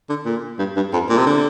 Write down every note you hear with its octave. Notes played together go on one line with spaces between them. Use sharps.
D3
A#2
G2
G2
F2
A#2
C3
D3